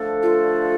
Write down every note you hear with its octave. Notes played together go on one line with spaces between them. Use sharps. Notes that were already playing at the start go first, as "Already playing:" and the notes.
Already playing: D3 F3 A3 D4 A4
F4